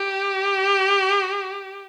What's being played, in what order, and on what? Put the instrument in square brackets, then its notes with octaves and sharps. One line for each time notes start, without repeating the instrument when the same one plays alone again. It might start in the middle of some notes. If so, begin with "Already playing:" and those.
Already playing: [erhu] G4